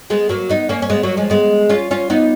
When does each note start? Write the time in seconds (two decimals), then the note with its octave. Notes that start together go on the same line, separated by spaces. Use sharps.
0.10 G#3 B3
0.29 F#3 A#3
0.49 B3 D#4
0.69 A#3 C#4
0.82 C#4
0.90 G#3 B3
1.03 F#3 A#3
1.17 F3 G#3
1.30 G#3 B3
1.69 C#4 F4
1.91 C#4 F4
2.10 B3 D#4